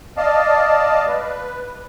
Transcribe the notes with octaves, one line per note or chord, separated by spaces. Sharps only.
D5 D#5 F5 A5
B4